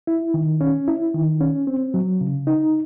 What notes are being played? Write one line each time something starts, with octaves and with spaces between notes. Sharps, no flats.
E4
D#3
C#4
E4
D#3
C#4
C4
F#3
C#3
D#4